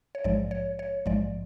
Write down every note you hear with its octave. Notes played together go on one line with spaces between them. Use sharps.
C#5
A#1 G#2 F3 G#3 D5
C#5
C#5
A#1 G#2 F3 G#3 D5